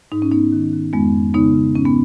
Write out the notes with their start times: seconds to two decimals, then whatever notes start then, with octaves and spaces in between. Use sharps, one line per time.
0.12 G#2 D#4
0.22 C#4
0.32 G#2 B3 D#4
0.52 D#3
0.73 D#3
0.93 F2 G#3 B3
1.14 F2
1.34 C#3 B3 D#4
1.54 C#3
1.75 G#2 C#4
1.85 B3